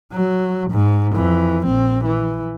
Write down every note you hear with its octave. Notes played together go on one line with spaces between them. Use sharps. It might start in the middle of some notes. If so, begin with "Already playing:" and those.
F#3
G#2
F2 E3
A#1 C4
E3